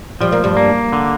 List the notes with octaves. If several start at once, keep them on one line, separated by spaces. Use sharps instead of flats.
F3 G3
A#3
G2 G3
A#3
D3